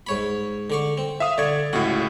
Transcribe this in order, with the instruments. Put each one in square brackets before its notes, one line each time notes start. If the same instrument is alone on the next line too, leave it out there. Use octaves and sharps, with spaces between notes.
[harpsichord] G#2 C#5 B5
D3 D5 C#6
C4
[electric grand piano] E5 F5 D#6
[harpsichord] D3 C#6 [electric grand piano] D5 G#6
[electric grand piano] C#2 A2 [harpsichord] F#4